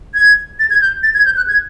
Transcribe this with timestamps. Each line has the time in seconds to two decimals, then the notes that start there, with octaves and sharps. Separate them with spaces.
0.15 G#6
0.59 A6
0.70 G#6
0.81 G6
1.03 A6
1.14 G#6
1.25 G6
1.37 F#6
1.48 G#6